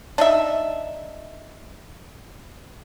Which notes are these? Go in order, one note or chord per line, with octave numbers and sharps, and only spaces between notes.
D4 D#4 E5